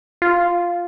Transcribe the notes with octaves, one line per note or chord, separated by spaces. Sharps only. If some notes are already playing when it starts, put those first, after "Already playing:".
F4